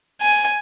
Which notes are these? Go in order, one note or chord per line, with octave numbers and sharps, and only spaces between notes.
G#5